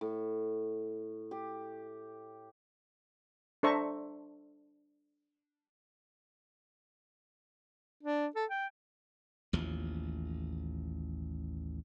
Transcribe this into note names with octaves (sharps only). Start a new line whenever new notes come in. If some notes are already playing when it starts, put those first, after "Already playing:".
A2
G4
D4 A4 C5 E5 A#5 C#6
D4
A4
G5
A1 D#2 F3